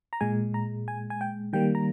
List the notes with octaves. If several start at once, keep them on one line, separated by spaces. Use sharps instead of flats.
A#5
A#2 G#3 G#5
A#5
G#5
G#5
G5
D#3 G3 A#3 G5
A#5